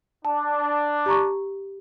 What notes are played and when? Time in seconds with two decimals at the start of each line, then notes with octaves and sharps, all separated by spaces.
0.25 D4 A5
1.06 G4 A#5 C#6